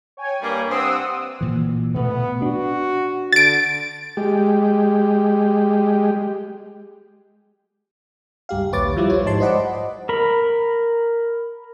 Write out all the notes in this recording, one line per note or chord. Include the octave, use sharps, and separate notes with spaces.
C#5 G5 G#5
G2 G3 A#3
G2 C4 F#5 D#6 E6
A#2 E3
B2 A3 B3
D4 F#4
D3 A6 D7
G#3 G4
C#2 G2 G4 F5
A#1 D#2 B4 C#5 D6 A6
F3 G3 E4 F4 G4
C5 C#5
G#2 F3 D#4 A5 C6
C5 D5 D#5 F#5 B5 D6
A#4 B5